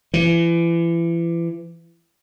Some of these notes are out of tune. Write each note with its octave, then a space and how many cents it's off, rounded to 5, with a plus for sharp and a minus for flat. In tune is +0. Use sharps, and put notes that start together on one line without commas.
E3 +35